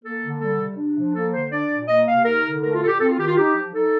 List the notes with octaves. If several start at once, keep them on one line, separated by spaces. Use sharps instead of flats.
A#3 A4
D3
G3 A4
C3
D4
F3
A#3 A4
D3 C5
D4 D5
A#2
A#3 D#5
C3 F5
D#4 A#4
D3
A3 A#4
F4
A#2 A4
G4
C4 A4
F4
D#3 G4
F4
D#4 G4
F3
D#4 A4